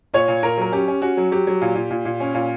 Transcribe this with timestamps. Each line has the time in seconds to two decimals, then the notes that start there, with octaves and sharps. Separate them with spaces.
0.14 A#2 C#5
0.28 A#2
0.43 A#2 A#4
0.58 F#3 A#4
0.72 C#4 G4
0.88 C#4
1.02 C#4 F#4
1.17 F#3
1.32 F#3 G4
1.47 F#3
1.61 A#2
1.75 A#2
1.90 A#2
2.05 A#2
2.20 C#4
2.34 A#2